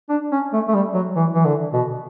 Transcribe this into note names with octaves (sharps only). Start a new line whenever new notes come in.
D4
C#4
A3
A3
G3
F#3
E3
E3
D3
B2